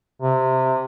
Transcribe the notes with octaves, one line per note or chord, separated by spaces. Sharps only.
C3